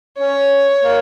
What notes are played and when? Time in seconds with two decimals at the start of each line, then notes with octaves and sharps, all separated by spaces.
0.18 C#4 C#5
0.84 A#3